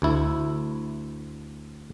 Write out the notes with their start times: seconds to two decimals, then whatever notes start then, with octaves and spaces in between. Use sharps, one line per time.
0.02 D2 E4